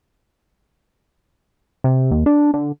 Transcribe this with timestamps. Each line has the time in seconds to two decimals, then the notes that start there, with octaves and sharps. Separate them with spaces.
1.84 C3
2.11 D#2
2.26 D4
2.54 D3